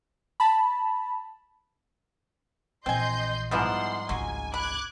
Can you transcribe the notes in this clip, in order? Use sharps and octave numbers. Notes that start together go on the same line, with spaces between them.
A5 B5
A#1 E3 C4 D#5 G#5 C6 G6
G#2 F3 G3 G#3 B3 E4 F#5 C6
G#1 C#2 F#3 G#5
B5 D6 F#6 G#6